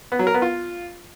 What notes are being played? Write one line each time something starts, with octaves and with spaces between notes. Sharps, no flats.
B3
F#3
A#4
B3
F4